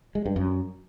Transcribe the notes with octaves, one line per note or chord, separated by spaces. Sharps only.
G#3
G2
F#2